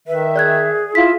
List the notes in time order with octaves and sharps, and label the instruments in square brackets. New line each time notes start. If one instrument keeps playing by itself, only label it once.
[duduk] D#3 [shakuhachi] B4 [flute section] E5
[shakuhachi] G#4 [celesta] D5 F#6 G#6
[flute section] E4 [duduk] F4 [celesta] F5 B6